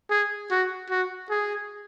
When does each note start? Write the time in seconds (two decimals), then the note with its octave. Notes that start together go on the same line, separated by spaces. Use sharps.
0.10 G#4
0.51 F#4
0.90 F#4
1.30 G#4